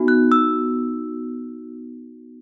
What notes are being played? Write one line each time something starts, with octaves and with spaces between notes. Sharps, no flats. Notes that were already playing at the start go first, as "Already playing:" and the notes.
Already playing: B3 D#4 F#4
F#6
E6